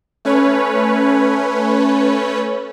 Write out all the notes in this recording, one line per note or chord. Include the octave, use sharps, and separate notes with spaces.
A3 C#4 B4 C#5